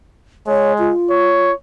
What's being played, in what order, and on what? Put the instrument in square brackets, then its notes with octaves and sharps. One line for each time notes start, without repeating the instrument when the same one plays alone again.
[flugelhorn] G#3 [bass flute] C#5
[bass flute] F4
[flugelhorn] C#5